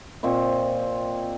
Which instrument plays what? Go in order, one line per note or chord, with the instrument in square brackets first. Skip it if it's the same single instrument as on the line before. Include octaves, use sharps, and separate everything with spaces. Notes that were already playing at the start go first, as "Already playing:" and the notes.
[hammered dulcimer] A#2 C4 D#5 C#6